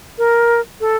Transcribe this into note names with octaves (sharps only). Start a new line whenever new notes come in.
A#4
A4